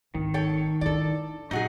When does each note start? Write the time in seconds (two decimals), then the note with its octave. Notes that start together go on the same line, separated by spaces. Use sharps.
0.15 G#1 D#3
0.34 A4 C#5 G5
0.81 D4 E4 A4 D5
1.51 A#2 F#3 D#4 F#4 G#4